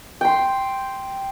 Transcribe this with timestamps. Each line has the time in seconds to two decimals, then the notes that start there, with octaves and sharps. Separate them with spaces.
0.21 G5 C6